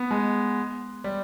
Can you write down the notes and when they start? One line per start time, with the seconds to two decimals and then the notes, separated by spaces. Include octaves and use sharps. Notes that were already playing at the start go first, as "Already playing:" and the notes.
Already playing: B3
0.11 G#3
1.04 G3